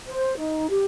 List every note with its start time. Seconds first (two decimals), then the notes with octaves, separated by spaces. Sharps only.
0.07 C5
0.37 D#4
0.69 G4